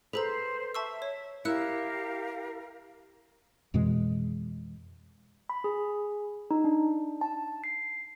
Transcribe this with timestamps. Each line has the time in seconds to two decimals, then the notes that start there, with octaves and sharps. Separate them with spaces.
0.13 G#4 A4 B4 C5 A#5
0.75 E5 A5 C#6 E6
1.02 C#5
1.45 E4 G4 A#4 F5 E6 F#6 C#7
3.74 F2 B2 E3 G#3
5.49 B5
5.64 G#4
6.51 D#4
6.64 D4
7.21 A5
7.64 C7